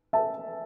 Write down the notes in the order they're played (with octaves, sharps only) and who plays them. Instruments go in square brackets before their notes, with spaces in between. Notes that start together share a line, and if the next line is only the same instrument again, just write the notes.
[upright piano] E5 A5